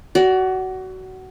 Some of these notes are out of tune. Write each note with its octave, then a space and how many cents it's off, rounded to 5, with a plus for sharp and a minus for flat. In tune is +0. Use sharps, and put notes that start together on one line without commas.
F#4 +20 D5 -20